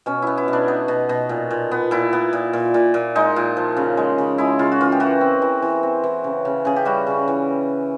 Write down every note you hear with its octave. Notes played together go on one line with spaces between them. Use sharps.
B2 C#4
B3 E4
E4
B2
D4
B3 D#4
B2
B2
A#2
A#2
B3
A#2 E4
B3
A#2
A#2
A#2
A#2
G#3 D#4
A#2
F3
C#3
G#3
C#3
G#3 E4
C#3 F4
F#4
E3 F4
G4
E3 F#4
C4
E3
E3
C4
E3
C#3
C#3
C#3 G#4
G4
G3 F#4
C#3
E3